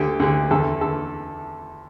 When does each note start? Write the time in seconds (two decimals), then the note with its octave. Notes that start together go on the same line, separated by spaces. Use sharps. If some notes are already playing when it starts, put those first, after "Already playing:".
Already playing: D2 D3 G4
0.20 D2 D3
0.51 E2 D3 A4
0.81 D3 A4